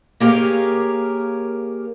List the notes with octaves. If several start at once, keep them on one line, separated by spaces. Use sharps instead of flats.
A#3 G4 G#4 A#4 C#5 F5